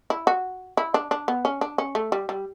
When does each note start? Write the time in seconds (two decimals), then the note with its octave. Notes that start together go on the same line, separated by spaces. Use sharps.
0.10 E4
0.27 F#4
0.77 E4
0.94 D4
1.11 D4
1.28 B3
1.45 C#4
1.61 D4
1.78 C#4
1.95 A3
2.12 G3
2.29 G3